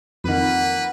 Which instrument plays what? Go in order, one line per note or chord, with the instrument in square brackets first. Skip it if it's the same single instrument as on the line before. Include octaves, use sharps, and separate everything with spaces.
[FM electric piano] F2 D#3 [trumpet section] A#3 B4 [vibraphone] F#5 B5